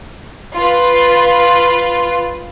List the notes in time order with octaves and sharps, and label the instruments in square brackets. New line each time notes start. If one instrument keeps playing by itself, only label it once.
[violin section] F4 B4